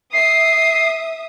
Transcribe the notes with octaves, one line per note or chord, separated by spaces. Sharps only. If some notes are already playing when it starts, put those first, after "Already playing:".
E5 D#6 C7